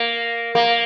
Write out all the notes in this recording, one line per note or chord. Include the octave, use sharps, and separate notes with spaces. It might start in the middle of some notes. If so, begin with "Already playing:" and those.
Already playing: A#3
A#3